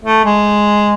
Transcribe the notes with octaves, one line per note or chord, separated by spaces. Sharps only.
A3
G#3